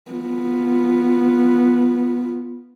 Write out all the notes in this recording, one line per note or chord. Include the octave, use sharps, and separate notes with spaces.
B3 F4